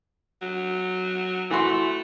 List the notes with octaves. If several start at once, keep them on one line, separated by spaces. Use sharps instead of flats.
F#3
E3 A3 F#4 C6